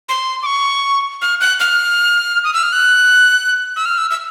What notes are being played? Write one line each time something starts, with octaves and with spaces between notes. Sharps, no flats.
C6
D6
C#6
F6
F#6
F6
D#6
E6
F6
F#6
E6
F6
E6
E6